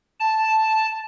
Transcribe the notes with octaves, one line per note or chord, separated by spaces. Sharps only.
A5